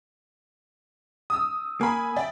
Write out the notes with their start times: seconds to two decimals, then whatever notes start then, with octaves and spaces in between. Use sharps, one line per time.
1.30 D#6 E6
1.81 A#3 G#5 B5
2.16 D5 E5 G5